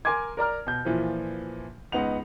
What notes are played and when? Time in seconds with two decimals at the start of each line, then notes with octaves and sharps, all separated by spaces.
0.05 A#4 G#5 C6 D6 G#6
0.37 A#4 D5 A#5 F6
0.67 B2 G6
0.85 A#2 E3 F3
1.92 C#2 B3 D#4 F#5 F7